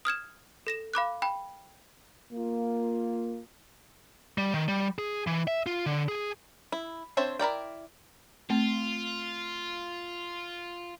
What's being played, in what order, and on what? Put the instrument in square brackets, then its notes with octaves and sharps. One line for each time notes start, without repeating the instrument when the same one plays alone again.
[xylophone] D#6 F6 G#6 E7
A4 A#6 E7
F5 B5 D6 F#6
G5 B5
[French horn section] A#3 F4
[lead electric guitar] G3
D#3
G3
G#4
E3
E5
F4
D3
G#4
[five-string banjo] E4
C4 D4 C5 C#5 E5
E4 A#4 D5 G5
[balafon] A3 C4 [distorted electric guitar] F4